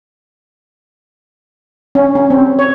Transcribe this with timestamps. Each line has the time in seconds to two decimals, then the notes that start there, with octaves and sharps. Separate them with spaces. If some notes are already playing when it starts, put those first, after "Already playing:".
1.95 C#4
2.15 C#4
2.30 C4
2.59 C#5